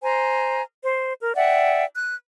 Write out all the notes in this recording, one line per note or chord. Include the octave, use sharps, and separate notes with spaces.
C5 G#5 A#5
C5
A#4
D5 E5 F#5 G5
F#6